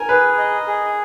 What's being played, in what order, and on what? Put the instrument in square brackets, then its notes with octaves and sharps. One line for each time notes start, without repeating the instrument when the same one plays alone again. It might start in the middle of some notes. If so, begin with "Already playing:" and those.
Already playing: [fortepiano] A#4 [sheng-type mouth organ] G#5
[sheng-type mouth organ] G#4 [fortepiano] B4
[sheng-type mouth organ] D#5
G#4